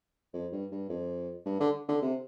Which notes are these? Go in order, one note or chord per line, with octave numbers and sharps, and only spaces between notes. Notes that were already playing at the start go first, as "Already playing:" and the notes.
F2
G2
G2
F2
G2
D3
D3
C3